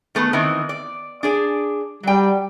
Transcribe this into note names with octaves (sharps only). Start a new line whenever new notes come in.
D#3 A3 B3
D#3 E3 C4
D5
D4 G#4 D5
F#3 G3 G5